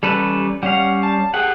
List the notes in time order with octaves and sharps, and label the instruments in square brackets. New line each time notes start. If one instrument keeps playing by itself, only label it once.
[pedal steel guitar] G3 A4 B4 [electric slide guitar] C#4 G4
[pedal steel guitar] G3 C#4 F5 [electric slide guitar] F#5
[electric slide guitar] A5
[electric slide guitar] G4 G#4 G5 [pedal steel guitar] F#5